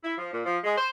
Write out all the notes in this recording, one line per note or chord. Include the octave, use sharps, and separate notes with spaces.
E4
F3
A#2
F3
G#3
C5